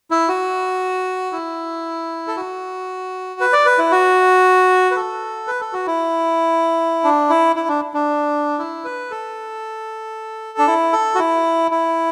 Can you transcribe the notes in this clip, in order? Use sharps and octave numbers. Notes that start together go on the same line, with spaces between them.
E4
F#4
E4
A4
F#4
B4
D5
B4
E4
F#4
B4
A4
B4
A4
F#4
E4
D4
E4
E4
D4
D4
E4
B4
A4
D4
E4
A4
F#4
E4
E4